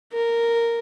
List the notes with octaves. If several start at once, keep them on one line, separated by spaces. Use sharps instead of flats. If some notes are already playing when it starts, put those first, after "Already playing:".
A#4